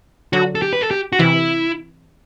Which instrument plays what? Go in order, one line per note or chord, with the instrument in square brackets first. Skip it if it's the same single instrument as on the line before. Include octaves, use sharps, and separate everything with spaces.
[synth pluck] D3 F#3 [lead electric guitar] F#4
[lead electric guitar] A4
G4
B4
A4
G4
F#4
[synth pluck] C3 E3 [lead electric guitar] E4